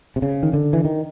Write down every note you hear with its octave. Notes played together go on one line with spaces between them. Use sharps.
C3
C#3
D#3
D3
E3
D#3